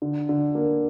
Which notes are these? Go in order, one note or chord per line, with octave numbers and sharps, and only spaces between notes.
D3
D3
A#3